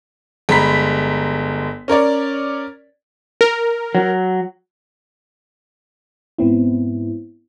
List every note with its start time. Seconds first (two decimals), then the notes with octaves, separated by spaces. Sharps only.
0.49 G1 G#3 A#5 B5 B6
1.88 C#4 A#4 C#5 D5
3.41 A#4
3.95 F#3
6.38 G#2 B3 C4 E4